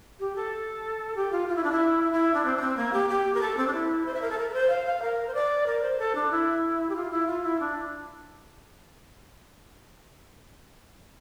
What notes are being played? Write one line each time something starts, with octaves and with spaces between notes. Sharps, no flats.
G4
A4
G4
F4
F4
E4
D4
E4
E4
D4
C4
D4
C4
A#3
G4
G4
A#4
A4
C4
D4
E4
C5
E5
A#4
A4
A#4
A#4
C5
F5
F5
A#4
C5
D5
A#4
C5
A4
D4
E4
G4
F4
E4
F4
E4
D4